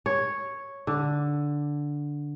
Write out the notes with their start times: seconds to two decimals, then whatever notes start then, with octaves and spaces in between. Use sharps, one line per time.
0.06 C#5
0.87 D3